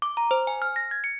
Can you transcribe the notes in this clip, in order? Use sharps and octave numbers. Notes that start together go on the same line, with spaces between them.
D6
A#5
C5
G#5
F6
A#6
G#6
C#7